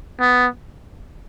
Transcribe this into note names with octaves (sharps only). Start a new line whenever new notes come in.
B3